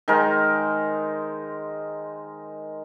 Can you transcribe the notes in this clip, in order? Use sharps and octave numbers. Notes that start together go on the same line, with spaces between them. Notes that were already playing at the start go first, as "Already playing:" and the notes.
D#3 G#3 A#4 C5